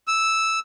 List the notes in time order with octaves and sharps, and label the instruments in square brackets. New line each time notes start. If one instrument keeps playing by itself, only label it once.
[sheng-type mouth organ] E6